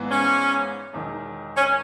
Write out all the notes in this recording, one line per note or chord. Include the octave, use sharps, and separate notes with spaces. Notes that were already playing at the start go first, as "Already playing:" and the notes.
Already playing: G#1 G#2 E3 B3
C#4
E1 E2 D#3
C#4